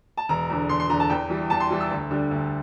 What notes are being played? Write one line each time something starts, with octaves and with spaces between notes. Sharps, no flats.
A5
E1 A#5
E2 D3
E1 C6
C6
E2 D3 A#5
A5
E2 G5
E3 G3
E2 A5
C6
E3 G3
E6
D2
D3 G3
D2